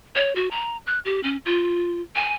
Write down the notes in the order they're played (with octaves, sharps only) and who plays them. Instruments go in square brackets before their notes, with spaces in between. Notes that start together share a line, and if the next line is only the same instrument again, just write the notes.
[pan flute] C#5
F#4
A#5
F#6
G4
C#4
F4
G#5